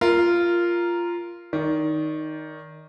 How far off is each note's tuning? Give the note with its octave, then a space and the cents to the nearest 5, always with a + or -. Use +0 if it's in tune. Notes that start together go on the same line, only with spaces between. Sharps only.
F4 -10 A#4 +0
D#3 +0 D5 -30